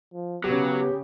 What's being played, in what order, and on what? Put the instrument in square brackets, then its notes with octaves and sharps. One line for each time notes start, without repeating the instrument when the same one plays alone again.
[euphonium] F3
[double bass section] C#3 [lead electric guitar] F#3 [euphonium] B3 [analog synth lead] G4